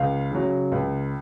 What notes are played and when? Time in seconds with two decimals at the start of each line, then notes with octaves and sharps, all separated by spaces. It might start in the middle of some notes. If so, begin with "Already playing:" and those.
Already playing: C#2 F5
0.32 C#3 F#3
0.72 C#2